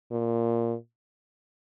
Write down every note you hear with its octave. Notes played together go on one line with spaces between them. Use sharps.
A#2